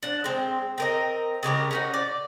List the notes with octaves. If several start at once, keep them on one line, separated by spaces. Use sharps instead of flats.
D4 F#5
G#3 C4
C4 A#4 D#5
C#3 G#3 G4 A#4
C#4 D#4 F#4
D5